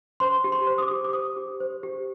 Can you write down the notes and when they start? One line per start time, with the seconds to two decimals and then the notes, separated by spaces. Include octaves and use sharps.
0.20 C5 C6
0.44 G4
0.52 C6
0.67 C5
0.78 D#6
0.82 D6
0.91 G4
1.05 D6
1.13 C5 D#6
1.36 G4
1.60 C5
1.83 G4